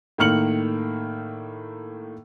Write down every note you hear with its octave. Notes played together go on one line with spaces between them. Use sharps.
A2 D#3 A#3 F6 C#7 F#7